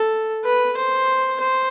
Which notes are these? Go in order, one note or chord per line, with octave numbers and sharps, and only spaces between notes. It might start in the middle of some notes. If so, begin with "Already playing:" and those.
Already playing: A4
B4
C5
C5